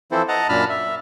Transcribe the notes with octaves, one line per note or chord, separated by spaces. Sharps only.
E3 F3 C4 E4 A4 C5
D#5 F#5 A5 A#5
F#2 A#2 D4 A5 B5 F6
E5